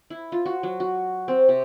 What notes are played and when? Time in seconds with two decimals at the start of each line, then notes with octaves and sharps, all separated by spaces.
0.10 E4
0.32 F4
0.46 F#4
0.63 F#3
0.80 F#4
1.28 C4
1.49 C3